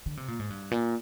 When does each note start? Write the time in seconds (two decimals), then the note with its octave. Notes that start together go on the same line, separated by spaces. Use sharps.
0.06 D3
0.17 C3
0.28 A#2
0.39 G#2
0.50 G2
0.71 A#2